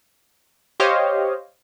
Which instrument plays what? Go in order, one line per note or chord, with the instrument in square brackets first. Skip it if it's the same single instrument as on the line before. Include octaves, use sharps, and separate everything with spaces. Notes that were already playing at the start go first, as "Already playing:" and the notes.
[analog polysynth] G4 C5 C#5 D#5 F5